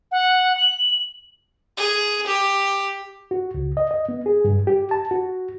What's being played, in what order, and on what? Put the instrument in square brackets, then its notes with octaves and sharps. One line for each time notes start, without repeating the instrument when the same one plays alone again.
[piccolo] F#5
F#7
[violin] G#4
G4
[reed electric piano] F#4
C#2
D#5
D#5
B3
G#4
G2
G4
A5
F#4